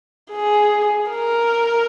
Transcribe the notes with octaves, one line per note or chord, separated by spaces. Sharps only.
G#4
A#4